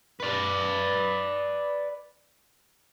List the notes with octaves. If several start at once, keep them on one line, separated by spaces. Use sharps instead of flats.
B4 D5